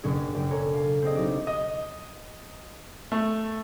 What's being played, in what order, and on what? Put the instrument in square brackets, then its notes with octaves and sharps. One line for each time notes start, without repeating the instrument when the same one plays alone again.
[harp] F#1 B2 C#4 D4 G#4
F#1 G5
D4 A4 C#5 G#5 A#5
F5 A5
C4 D4 G#4 D#5
B1 D#4 G4 D6
[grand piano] D#5
A3